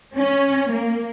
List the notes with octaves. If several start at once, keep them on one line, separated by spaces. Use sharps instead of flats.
C#4
A#3